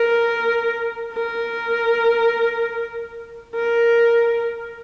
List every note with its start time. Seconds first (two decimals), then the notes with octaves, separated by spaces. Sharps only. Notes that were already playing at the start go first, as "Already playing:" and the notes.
Already playing: A#4
1.14 A#4
3.55 A#4